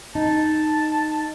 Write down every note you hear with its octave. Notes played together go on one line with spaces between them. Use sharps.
D#4 A5